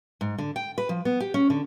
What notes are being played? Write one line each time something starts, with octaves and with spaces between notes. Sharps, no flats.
G#2
D3
G5
B4
F3
B3
G4
C#4
D3